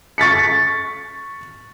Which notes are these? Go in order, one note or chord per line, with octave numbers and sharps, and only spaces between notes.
C#6 A6 B6 C#7